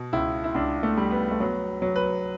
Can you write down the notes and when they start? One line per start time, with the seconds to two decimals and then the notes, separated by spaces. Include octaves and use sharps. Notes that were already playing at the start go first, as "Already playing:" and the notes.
Already playing: B2
0.13 C#2 E4
0.44 E4
0.54 C#2 D4
0.83 A3
0.97 G3
1.11 B3
1.31 A3
1.40 F#3 B3
1.82 F#3
1.96 B4